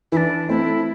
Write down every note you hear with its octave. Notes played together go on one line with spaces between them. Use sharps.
E3 D4 E4
A3 C4 E4